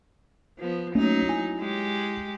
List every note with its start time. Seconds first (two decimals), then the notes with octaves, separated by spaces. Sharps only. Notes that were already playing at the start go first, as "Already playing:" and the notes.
0.58 F3 B3
0.95 F#3 A3 A#3 C#4 D#4
1.26 E4 G#5
1.58 G#3 G4